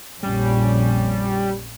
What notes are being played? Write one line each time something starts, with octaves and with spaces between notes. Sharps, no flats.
A#1 F2 G3 C#4